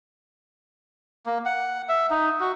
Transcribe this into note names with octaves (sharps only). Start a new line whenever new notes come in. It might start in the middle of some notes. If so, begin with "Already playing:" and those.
A#3
F#5
E5
D#4
F#4